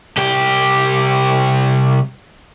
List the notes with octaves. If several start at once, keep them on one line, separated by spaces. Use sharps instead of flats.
C2 G4